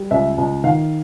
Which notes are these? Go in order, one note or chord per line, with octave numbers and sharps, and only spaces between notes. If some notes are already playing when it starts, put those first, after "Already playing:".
Already playing: G3
C#2 E5
C#2
D#3 F5